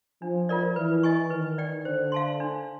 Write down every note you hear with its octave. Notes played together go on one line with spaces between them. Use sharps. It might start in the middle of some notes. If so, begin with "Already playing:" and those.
F3 D4
F4 A#4 D5
E3 B4
D#5 G#5 C#6
D#3 B4
D5 G5
D3 C5
F5 A5 C6
D4